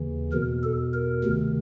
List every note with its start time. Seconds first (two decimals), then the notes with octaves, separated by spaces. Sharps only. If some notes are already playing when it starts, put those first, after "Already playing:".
Already playing: D#2 C#3 E3
0.32 E2 B2 A#4
0.63 A4
0.94 A#4
1.24 D2 C3 D#3